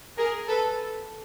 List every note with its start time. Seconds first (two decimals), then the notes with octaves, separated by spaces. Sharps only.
0.17 G#4 A#4
0.48 A4 B4